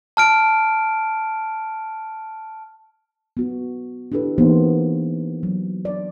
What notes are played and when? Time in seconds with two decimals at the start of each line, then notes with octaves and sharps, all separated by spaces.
0.17 A5 F6 D7
3.37 B3 F#4
4.12 D4 E4 G4 A4 B4
4.38 E3 A#3 B3 D#4 G4 C5
5.43 F#3
5.85 D5